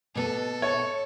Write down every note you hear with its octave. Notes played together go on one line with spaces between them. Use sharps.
B2 B3 A4
C#5